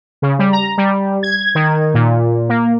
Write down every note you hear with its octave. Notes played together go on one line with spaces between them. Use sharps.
C#3
G3
A#5
G3
G#6
D#3
A#2
A#3